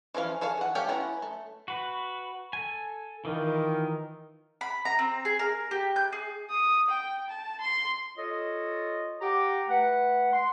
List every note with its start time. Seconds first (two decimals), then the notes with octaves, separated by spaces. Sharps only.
0.14 E3 F3 C#4 F5
0.41 G#4 A4 C#5 F5
0.57 E3 F#5
0.75 A3 G4 C#5 F5 G5
0.88 B3 C#4 E4 F#5 A#5
1.22 A3
1.68 F#4 B4
2.53 A4 G#5
3.25 D#3 E3 D#4 F4
4.61 B5
4.85 A#5
4.99 C4
5.25 G#4
5.39 A#4
5.71 G4
5.96 G6
6.12 G#4
6.50 D#6
6.89 G5
7.28 A5
7.61 C6
8.17 F4 A4 C#5 D#5
9.21 G4 F#5 G5 A#5 D6
9.69 A3 B4 F#5
10.32 F#5 C6